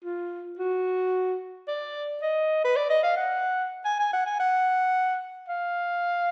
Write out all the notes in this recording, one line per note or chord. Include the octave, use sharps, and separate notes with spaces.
F4
F#4
D5
D#5
B4
D5
D#5
F5
F#5
G#5
G#5
F#5
G#5
F#5
F5